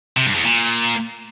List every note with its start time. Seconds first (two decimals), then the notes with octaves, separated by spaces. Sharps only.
0.17 C3
0.26 G2
0.35 E2
0.44 A#2